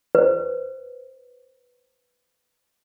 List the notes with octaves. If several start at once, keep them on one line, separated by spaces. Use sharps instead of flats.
B4 C5